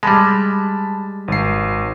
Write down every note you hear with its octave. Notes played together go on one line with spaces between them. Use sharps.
G3 G#3 A5 B5
G#1 C7